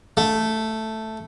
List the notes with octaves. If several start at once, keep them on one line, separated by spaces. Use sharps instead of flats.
A3